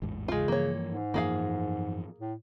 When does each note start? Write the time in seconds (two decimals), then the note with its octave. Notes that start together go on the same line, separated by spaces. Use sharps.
0.02 A1 E2 G#2
0.28 C#3 G#3 F4
0.48 G2 E3 F3 A#3 C#5
0.85 G#2
1.14 F#2 E3 F3 A#3 G#4 F5
2.20 A2